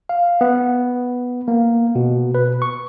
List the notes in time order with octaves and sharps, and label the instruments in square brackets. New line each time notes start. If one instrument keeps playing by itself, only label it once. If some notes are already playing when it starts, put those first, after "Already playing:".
[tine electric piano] F5
B3
A#3
B2
B4
C#6